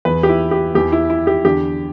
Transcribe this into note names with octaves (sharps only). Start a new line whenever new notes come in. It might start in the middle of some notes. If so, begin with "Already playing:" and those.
E2 E3 B4
G4
E4
G4
E2 E3 G4
E4
E4
G4
E2 D3 G4